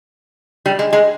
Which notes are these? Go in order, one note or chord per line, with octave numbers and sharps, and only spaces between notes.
G3
G#3
G#3